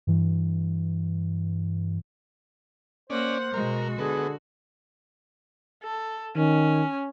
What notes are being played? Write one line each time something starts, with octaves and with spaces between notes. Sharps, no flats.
G2 E3
A#3 C#4 C5 D5 F#5
B2 G#3 F#4 A#4
D3 B3 G#4
A4
D#3 C#4